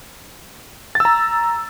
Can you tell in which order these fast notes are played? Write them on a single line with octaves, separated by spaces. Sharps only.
A6 E6 A#5